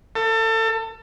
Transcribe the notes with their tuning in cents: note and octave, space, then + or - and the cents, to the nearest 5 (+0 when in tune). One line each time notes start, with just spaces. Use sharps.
A4 +30